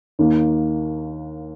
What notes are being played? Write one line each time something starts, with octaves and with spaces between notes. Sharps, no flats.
D#2 D#3 A#3